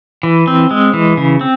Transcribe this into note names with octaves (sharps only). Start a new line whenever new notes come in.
E3
C4
G#3
E3
C#3
C4